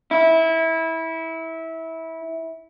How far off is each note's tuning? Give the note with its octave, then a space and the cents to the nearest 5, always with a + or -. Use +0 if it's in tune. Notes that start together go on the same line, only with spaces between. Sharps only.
E4 -20